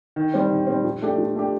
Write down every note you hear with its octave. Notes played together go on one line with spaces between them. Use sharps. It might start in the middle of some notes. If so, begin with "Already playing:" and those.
D#3
G3 C4
D#3
G3 C4
F3
A3 D4 G4
F3
A3 D4 G4